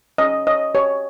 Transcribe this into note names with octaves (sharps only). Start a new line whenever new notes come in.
C#4 D#5
C#5 D#5
G4 C#5